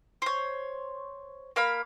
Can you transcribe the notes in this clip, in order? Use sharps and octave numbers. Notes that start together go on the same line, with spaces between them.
C5 C#5
A#3 F5 B5